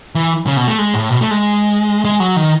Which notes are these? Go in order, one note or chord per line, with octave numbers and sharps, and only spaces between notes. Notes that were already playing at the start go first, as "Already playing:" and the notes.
E3
C#3
B2
A3
G#3
A2
B2
A3
G#3
G#3
F#3
D#3